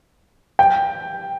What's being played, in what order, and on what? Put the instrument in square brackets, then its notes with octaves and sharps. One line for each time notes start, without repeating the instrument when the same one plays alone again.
[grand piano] G5